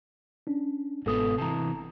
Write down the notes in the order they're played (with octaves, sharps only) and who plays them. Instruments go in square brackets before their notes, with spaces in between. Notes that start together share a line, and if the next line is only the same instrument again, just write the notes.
[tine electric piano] C#4 D4
[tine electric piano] G1 A4 D#6 [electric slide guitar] G#2 B2 B3
[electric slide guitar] C3 E3 [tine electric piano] A5 A#5